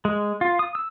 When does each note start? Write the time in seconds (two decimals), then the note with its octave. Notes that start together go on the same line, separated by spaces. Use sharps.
0.05 G#3
0.41 F4
0.59 D#6
0.75 E6